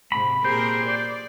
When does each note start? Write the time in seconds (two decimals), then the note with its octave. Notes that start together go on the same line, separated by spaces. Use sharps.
0.12 G#2 C3 C4 B5
0.45 A#2 G4 G#4 A#4 C5
0.86 D5